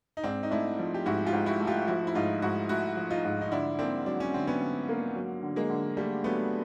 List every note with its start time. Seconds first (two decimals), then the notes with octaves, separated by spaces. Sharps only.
0.17 D#4
0.23 G#2 C4 D4
0.43 D#4
0.51 A3 D4 E4
0.79 F3
0.94 G4
1.06 G#2 E4 F#4
1.26 F4 G4
1.33 G#2
1.46 E4 F#4
1.61 A3
1.67 F4 G4
1.87 F3 E4 F#4
2.07 E4
2.15 G#2 D#4 F4
2.42 G#2 E4 F#4
2.69 A3 E4 F#4
2.97 F3
3.10 D#4 F4
3.25 G#2
3.41 D#4
3.52 D3 D4 E4
3.79 A#3 C4 D4
4.06 F#3 D4
4.20 C#4
4.34 D3 C4
4.47 B3 C#4
4.61 D3
4.89 A#3
5.16 F#3
5.43 D3
5.56 G#3 A#3
5.70 D3
5.97 G3 A3 A#3
6.24 F#3 A3 B3